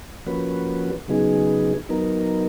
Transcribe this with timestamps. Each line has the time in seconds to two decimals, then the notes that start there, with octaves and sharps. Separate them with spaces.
0.26 F3 A#3 C#4 F#4 B4
1.08 C#3 F#3 B3 D#4 G#4
1.89 F#3 B3 D#4 A#4